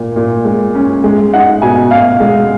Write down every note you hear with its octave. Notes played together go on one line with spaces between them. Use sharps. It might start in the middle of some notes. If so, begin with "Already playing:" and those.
Already playing: A#2
A#2
G#3
C#4
G#3
D#4 F#5
B2 G#5
B2 F5
G#3